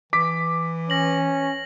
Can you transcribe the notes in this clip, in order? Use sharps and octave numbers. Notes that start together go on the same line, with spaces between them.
E3 D6 B6
C#4 A#6 F#7